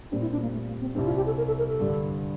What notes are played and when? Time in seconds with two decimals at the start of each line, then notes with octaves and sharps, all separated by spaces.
0.11 A#2 G3 C4 D4 G4
0.21 E4
0.32 D4
0.42 A#3
0.53 A3
0.67 A#3
0.81 C4
0.95 C2 C3 G3 C4 D4
1.06 F4
1.16 G4
1.26 A4
1.37 A#4
1.47 A4
1.58 A#4
1.69 A4
1.79 G2 D3 G3